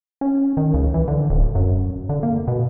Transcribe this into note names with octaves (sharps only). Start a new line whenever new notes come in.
C#4
D#3
C#2
E3
D3
D1
F#2
D3
A#3
B2